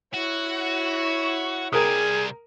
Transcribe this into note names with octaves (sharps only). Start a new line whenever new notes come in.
E4 F#4 C#5
C3 G3 G#4 A#4 D#6